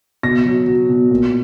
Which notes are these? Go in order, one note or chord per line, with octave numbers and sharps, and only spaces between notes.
B2 A#6
F#3
F#3
B2
A#2